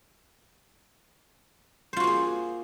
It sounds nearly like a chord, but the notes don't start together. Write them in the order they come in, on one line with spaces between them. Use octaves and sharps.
C5 F4 F#4 A#3 G#4